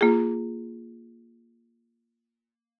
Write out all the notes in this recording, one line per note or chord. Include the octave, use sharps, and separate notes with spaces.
A#3 F4 G#4